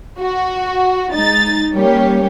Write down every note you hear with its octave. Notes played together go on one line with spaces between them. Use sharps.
F#4
G#3 D#4 A6
G3 A#3 C#4 G4 C#5